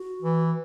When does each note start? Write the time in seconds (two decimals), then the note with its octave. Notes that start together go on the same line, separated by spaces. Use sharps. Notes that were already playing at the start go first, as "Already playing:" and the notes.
Already playing: F#4
0.22 E3